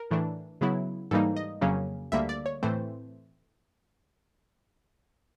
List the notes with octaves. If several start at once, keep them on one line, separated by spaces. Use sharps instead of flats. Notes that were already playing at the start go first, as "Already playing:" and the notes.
Already playing: A#4
A2 E3 A3 D4
C#3 F#3 B3 E4
G#2 E3 G3 A#3 D#4 A4
D#5
F2 C#3 F#3 A#3 C#4
D2 D3 G3 A#3 E5
D5
C#5
A2 E3 A3 C4 C5